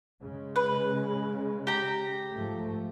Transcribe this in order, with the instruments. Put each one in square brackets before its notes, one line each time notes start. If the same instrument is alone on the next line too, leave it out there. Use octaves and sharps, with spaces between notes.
[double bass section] C#3 G#3
[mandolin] B4
G4 A#5
[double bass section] G#2 F3 A3